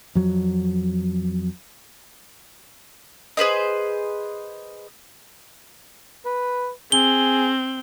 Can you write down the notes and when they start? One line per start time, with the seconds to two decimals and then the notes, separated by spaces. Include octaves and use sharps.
0.15 F2 F#3
3.37 G#4 B4 C5 D#5
6.25 B4
6.92 C4 G#4 G7